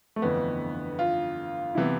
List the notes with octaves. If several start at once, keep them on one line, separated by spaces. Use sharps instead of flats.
A3
G1 F2 E3 B3
F4
C3 E3 B3 E4